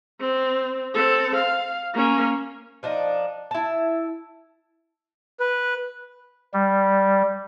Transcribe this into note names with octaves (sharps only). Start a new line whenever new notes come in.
C4
C4 A4
F5
A#3 C#4
F3 D4 D#4
E4 A5
B4
G3